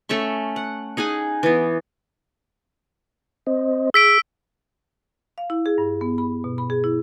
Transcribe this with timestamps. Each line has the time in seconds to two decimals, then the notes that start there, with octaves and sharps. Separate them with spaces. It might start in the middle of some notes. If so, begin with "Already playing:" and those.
0.09 A3 C#4 E5 C#6
0.56 F#5
0.97 D#4 G#4 F#5 G#5
1.43 E3 B3
3.47 C4 C5 D#5
3.94 G#4 E6 B6 D7
5.38 F5
5.50 E4
5.66 G#4
5.78 G2
6.01 B3
6.18 B5
6.44 B2
6.58 B5
6.70 G#4
6.84 E4